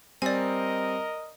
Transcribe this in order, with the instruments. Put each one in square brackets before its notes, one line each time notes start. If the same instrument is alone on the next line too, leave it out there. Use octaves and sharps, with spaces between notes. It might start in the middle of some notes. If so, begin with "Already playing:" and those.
[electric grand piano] G3 C4 [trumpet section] A#4 D#5 [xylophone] D5 G#5